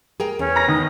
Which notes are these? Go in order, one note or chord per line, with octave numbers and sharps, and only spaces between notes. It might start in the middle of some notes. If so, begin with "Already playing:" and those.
G#4 A#4 G5
E2 C#4
A#5 A#6
D#3 D#6